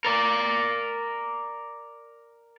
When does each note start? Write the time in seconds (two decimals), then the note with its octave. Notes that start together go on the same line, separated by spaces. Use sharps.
0.05 A#4 D5